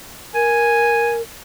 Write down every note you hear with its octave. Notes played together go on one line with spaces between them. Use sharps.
A#4 G#5